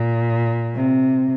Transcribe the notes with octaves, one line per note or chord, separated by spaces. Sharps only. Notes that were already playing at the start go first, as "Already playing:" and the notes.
Already playing: A#2
C3